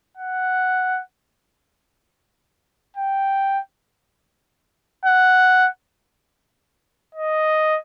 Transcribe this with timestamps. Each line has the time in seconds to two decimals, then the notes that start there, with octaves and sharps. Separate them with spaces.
0.17 F#5
2.97 G5
5.05 F#5
7.15 D#5